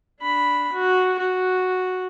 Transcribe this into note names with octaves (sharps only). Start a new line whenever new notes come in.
D4 B5
F#4
F#4